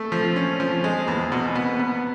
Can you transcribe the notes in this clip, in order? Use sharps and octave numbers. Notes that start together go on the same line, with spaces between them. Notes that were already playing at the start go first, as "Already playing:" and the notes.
Already playing: A3
F3
C#4
F3
G#3
E2
B2
B3
B3